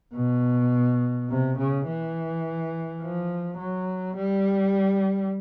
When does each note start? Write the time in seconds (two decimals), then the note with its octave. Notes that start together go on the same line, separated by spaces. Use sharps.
0.15 B2
1.30 C3
1.58 C#3
1.87 E3
3.01 F3
3.58 F#3
4.16 G3